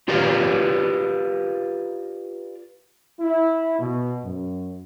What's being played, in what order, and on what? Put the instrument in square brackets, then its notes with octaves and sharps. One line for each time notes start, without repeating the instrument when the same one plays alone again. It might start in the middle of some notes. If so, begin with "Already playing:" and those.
[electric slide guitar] F4 G4 A#4 B4 D5 F5
[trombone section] E4
B2
F#2